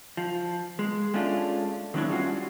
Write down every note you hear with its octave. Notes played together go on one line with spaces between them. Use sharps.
F3
G#3
G#3 A3 C#4 D4 F4
D#3 F#3 G#3 D4 E4 C#5
G3 C#4 F4 F#4